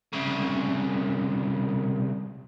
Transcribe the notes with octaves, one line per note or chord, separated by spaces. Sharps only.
C2 C#3